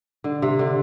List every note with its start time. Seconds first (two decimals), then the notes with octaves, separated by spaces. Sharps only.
0.24 D3
0.42 C3
0.59 D3